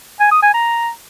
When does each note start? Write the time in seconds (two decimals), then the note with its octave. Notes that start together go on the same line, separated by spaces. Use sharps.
0.20 G#5
0.31 D#6
0.42 G#5
0.54 A#5